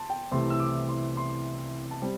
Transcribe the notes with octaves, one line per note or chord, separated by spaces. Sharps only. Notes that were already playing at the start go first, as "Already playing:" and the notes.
Already playing: A5 C6
G5
C2 C3 E3 A3 C6
E6
D6
C6
C6
A5
G3 C4